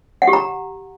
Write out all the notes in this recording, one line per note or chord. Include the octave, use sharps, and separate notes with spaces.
F#5
G4
A#5